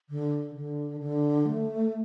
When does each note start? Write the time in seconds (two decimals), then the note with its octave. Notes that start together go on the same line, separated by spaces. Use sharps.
0.09 D3
0.55 D3
1.00 D3
1.46 A3